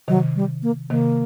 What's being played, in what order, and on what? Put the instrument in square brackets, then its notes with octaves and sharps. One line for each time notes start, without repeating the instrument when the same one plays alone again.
[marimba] C3 D#3 [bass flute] F#3
[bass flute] G3
A#3
[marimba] C3 D#3 [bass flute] A#3